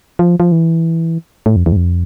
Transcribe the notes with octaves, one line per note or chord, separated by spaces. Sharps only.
F3
F3
E3
A2
F2
E2
G#2
F2